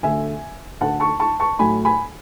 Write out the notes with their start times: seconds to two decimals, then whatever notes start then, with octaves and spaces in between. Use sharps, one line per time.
0.03 D2 D3 A3 E5 G#5
0.81 D2 D3 A3 F#5 A5
1.00 A5 C#6
1.20 A5 C#6
1.40 A5 C#6
1.59 A2 F#3 A3 G#5 B5
1.85 G#5 B5